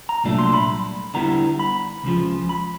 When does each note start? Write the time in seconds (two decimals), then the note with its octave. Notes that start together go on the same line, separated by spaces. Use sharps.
0.09 A#5
0.24 C2 A#2 F#3 A3 D4
0.39 C6
0.53 B5
1.14 D3 G3 B3 E4 A#5
1.59 B5
2.04 C#2 C#3 F3
2.49 B5